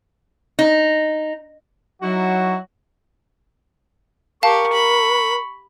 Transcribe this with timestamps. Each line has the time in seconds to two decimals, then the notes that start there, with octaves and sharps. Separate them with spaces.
0.59 D#4
2.02 F#3 D#4 E4 F#4
4.43 G4 A#4 F5 A5 C#6
4.72 B5